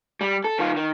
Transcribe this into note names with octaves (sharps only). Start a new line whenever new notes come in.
G3
A4
D#3 F4
D#3